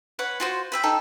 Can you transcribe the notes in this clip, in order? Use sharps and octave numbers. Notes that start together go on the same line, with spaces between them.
B4 C#5 F#5
F4 F#4 C5
B4 E5 G5
D#4 A4 G5